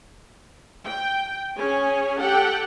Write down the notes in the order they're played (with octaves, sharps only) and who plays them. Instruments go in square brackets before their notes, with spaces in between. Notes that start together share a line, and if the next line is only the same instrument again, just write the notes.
[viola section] G5
C#4 G#4 C#5 G#5
G4 A4 F#5 G5